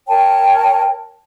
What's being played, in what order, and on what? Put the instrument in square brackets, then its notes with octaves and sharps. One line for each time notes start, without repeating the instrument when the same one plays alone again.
[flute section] A#4 C#5 G5 A5